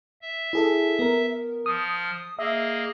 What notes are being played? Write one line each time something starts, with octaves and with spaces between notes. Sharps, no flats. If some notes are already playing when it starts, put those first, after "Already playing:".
E5
E4 G#4 A4
B3 A#4
F3 D#6 F6
A#3 G#4 D#5 E5